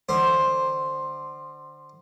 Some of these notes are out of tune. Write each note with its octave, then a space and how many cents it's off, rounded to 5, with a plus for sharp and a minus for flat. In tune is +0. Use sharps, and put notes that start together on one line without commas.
D3 +30 C5 +5